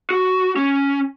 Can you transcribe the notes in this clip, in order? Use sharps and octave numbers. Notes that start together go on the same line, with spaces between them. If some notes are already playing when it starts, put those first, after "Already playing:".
F#4
C#4